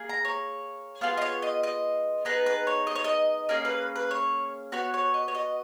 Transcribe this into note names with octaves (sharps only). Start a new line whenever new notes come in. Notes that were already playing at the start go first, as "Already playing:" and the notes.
Already playing: A#3 G#4
A#5
C#5
B3 F4 G#4 F5
D#5
C#5
D#5
D#5
B3 D#4 G#4 B4
B4
C#5
D#5
C#5
D#5
A#3 C#4 G#4 D#5
B4
B4
C#5
B3 F#4 C#5
C#5
D#5
C#5
D#5